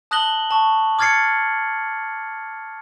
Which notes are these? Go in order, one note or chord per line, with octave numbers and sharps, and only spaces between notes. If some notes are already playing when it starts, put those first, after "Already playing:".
A5 D#6 F#6 A#6 F#7 G7
A5 C#6
D6 F6 G#6 A6 C7 C#7